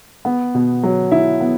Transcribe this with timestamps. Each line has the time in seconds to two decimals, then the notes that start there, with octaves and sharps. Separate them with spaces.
0.25 B3
0.55 B2
0.83 F#3
1.12 E4
1.41 B3